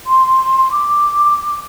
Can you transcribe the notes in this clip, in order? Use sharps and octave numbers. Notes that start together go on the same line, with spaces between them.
C6
D6